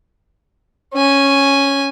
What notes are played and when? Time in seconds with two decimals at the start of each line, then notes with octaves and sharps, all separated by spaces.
0.94 C#4 G#5